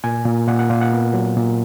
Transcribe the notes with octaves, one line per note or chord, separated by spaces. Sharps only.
A#2 G#5
A#2
A#2 F#5
F#5
A#2 F5
F#5
B3
F#3
A#2